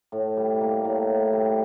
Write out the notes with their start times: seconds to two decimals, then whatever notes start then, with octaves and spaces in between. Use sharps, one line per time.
0.12 A2
0.37 G3
0.61 A#3
0.85 A2
1.09 A2
1.33 G3